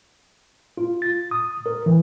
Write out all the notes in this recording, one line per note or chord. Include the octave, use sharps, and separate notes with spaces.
F4
A6
D#6
A#4
E3